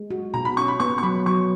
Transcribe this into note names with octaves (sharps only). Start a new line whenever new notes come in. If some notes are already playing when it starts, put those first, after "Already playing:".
Already playing: G#3
F#4
B2 A#5
B5
C#4 C#6
B5
B3 C#6
C#6
F#3 B5
F#3 C#6